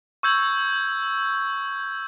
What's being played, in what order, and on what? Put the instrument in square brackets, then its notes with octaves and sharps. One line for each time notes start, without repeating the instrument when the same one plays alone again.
[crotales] C#6 E6 G6 G#6 F#7